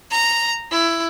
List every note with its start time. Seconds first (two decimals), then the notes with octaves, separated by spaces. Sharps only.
0.11 A#5
0.71 E4